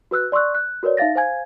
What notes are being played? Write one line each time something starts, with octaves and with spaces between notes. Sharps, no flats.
F#4 B4 E6 F#6
D5 C6 C#6 E6 F#6
F#6
F#4 A#4 B4 C#5 D5
D#4 E5 F5 A6 A#6
C5 F5 G#5 G#6